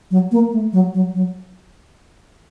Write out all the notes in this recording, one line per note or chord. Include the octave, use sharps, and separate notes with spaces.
F#3
A#3
A3
F#3
F#3
F#3